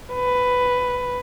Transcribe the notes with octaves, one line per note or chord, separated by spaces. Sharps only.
B4